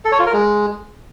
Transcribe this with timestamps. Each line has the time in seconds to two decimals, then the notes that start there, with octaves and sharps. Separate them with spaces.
0.05 A4
0.12 C#5
0.19 F4
0.26 A#4
0.33 G#3